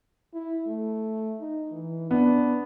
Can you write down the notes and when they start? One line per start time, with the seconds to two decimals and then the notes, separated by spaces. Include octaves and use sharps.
0.34 E4
0.67 A3
1.41 D#4
1.72 E3
2.11 B3 D4